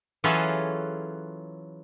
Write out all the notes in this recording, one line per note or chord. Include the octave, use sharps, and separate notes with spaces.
E3 F#3 C#4 F4 G#4 A4